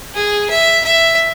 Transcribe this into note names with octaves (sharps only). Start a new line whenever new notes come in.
G#4
E5
E5